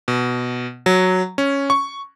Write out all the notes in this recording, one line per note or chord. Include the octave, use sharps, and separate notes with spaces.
B2
F#3
C#4
C#6